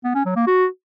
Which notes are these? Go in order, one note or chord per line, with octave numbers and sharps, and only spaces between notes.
B3
C#4
F#3
A#3
F#4